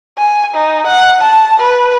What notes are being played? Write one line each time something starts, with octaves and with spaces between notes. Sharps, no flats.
G#5
D#4
F#5
A5
B4